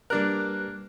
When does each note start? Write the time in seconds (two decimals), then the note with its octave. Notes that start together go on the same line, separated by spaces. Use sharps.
0.10 G3 A#3 D4 G4 A#4 B4 F#6